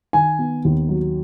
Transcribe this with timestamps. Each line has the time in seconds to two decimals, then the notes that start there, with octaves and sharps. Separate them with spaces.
0.13 D#3 G#5
0.39 B3
0.65 D#2
0.89 F#3